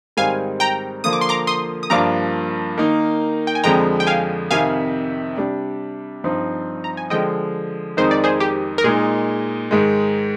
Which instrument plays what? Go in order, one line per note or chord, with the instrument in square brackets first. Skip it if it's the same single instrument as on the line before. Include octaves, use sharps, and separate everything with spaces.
[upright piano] G#2 D#3 G3 C4 [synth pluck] F5 G#5
[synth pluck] G5 A#5
[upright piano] D3 F3 A#3 F4 [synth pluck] D#6
[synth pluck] D6
C6
A#5 D6
C6 D#6
D#6
[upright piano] G2 F3 A#3 D4 F4 [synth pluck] A#5 D6
[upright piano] D#3 A#3 D#4
[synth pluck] G5
G#5
[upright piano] F2 D3 F3 G#3 [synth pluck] G5 A#5
[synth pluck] G5
F5 G#5
[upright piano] F2 C3 D#3 [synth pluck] F5 G#5
[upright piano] C3 G3 D4
G2 F3 C4 D#4
[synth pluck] A#5
G#5
[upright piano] D3 F3 G#3 [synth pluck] D#5 G5
[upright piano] F2 D#3 G#3 D#4 [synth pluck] C5
[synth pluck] D5
G#4 C5
G4
A#4
[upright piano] A#2 G#3 D#4 [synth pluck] G#4
[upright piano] G#2 D#3 G#3